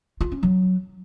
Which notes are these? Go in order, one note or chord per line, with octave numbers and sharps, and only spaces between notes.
F4
C#4
F#3